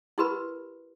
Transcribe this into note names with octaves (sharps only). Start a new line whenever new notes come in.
E4 F#4 G4 A#4 B4 B5